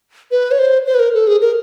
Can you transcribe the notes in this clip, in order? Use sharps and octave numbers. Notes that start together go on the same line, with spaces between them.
B4
C#5
C5
C5
B4
A#4
A4
G#4
A#4